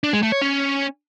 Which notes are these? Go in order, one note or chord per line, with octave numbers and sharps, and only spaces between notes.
D4
G#3
A3
C#5
C#4